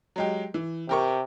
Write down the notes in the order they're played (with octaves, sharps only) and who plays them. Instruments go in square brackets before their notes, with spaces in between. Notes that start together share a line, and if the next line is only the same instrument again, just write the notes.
[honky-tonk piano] F#3 G#3 G4
E3
[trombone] C3 [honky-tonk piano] G4 A#4 C#6